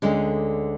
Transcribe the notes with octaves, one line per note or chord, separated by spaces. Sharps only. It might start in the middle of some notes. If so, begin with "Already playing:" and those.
D2 D3 G#3 C#4